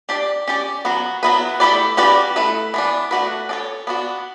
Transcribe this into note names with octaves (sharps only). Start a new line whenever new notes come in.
D4 G4 D5
C#4 G4 D5
F#3 B3 F#4
F#3 B3 E4 B4
A3 E4 G4 B4 D5
G3 C#4 F#4 B4 D5
A3 E4 B4
E3 B3 D4
A3 D4 F#4 B4
D4 A4 C#5
B3 D4 F#4